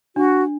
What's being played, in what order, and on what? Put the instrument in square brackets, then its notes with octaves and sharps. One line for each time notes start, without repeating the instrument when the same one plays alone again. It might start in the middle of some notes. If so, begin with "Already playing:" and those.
[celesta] D4 [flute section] F#4